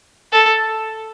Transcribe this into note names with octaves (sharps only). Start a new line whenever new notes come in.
A4